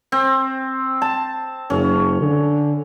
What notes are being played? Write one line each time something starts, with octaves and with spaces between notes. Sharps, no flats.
C4
A5
F#1 C#4
D3